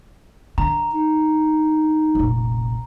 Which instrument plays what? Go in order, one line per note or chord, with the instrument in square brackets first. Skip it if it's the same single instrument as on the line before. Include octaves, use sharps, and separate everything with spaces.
[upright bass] D3 [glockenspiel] A#5
[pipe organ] D#4
[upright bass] F1 A#1